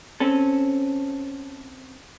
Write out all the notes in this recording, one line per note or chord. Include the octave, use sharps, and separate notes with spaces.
C4 C#4 A4